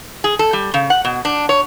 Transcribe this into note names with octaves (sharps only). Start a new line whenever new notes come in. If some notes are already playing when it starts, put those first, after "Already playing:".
G#4
A4
G3
C#3
F#5
B2
D4
C#5